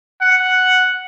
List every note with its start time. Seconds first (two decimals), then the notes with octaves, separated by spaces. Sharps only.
0.21 F#5